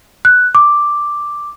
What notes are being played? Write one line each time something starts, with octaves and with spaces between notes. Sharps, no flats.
F#6
D6